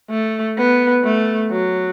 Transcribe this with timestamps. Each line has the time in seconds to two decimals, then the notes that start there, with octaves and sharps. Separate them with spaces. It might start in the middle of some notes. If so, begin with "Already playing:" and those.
0.10 A3
0.58 B3
1.04 A3
1.51 F#3